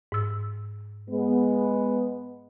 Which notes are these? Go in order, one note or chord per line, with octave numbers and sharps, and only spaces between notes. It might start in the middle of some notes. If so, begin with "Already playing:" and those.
G#2 E6
G#3 B3